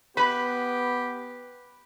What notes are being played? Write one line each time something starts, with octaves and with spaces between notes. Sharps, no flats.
B3 G4 B4 B5